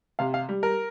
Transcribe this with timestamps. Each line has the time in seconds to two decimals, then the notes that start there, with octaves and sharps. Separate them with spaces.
0.19 C3 F5
0.34 F5
0.49 G3
0.63 A#4